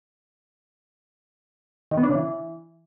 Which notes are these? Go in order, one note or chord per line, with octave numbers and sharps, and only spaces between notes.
D#3
B3
D4
C#3
E3